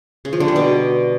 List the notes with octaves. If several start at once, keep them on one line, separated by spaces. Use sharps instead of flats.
C#3
F3
D3
G3
B2